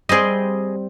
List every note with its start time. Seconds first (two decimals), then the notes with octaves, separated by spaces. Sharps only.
0.09 G3 C4 G#4 D#5